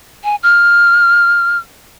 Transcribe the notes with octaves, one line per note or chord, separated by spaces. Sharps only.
G#5
F6